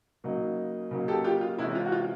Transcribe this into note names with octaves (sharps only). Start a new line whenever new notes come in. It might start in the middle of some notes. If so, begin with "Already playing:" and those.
C#3 F#3 A#3 D#4
C#3 F#3 A#3 D#4
G4 A4
F4 G4
F4
C3 E3 G#3 C#4 E4
F4
F#4
F4